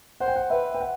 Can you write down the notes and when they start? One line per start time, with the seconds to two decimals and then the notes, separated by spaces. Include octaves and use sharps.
0.20 C5 F#5
0.28 G5
0.36 F#5
0.50 B4 E5
0.75 G5
0.80 F#5